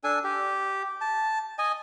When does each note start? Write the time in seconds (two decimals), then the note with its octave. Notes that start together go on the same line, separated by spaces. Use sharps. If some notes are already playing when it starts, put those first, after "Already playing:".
0.04 D4 A4 G#5
0.24 G4
1.01 A5
1.59 D#5 G#5